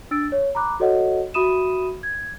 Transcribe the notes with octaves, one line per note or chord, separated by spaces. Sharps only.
D4 E6 A6 D7
C#5
A#5 B5 D6 F#6
F#4 A4 C#5 D#5 F#5
F#4 E5 B5 D#6 D#7 E7
G#6